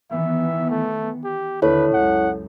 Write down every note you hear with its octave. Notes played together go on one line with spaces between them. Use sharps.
D#3 E3 B3 E5
A3
G4
D#2 D3 E4 A4 B4 C#5
C#2 F#2 F#5